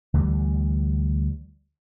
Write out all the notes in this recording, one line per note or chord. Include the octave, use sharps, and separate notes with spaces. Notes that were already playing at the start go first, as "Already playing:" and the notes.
D2 E3 G3